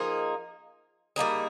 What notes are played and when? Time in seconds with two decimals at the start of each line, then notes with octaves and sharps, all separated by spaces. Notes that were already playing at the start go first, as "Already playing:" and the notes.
Already playing: F3 A#3 D#4 G#4
1.16 G3 A#3 D#4 G#4